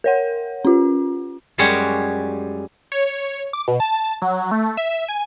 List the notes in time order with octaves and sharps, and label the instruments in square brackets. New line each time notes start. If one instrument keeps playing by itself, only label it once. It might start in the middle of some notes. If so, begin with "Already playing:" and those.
[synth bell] A#4 C#5 F#5
C#4 F4
[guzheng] F#2 G3 G#3 C#5 F#5 G5
[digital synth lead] C#5
D6
B2
A5
F#3
A3
E5
G#5